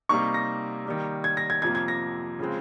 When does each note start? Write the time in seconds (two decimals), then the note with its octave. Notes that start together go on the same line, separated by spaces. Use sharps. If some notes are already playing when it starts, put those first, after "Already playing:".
0.09 C3 G3 A#3 D#4 C#6
0.34 A#6
0.86 D#3 G3 A#3
1.24 G#6
1.37 A#6
1.50 G#6
1.62 F2 C3 F3 A#3 G#6
1.75 G#6
1.88 A#6
2.39 C#3 F3 G#3 C4